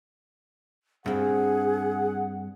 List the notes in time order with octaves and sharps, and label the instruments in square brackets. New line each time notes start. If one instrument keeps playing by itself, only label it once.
[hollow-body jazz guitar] G2 C4 [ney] G#4 [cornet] F#5